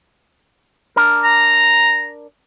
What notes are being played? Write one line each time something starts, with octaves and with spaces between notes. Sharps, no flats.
D4 A#4
A#5